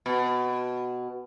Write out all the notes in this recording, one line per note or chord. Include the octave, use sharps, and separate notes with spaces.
B2